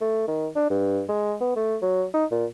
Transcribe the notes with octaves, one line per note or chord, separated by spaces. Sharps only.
A3
D#3
D4
G2
G#3
B3
A3
F#3
D#4
A#2